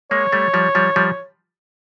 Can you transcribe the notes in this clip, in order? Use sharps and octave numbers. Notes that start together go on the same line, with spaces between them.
G#3 A#3 C#5
G3 A3
F3 G3
F3 G3
F3 G3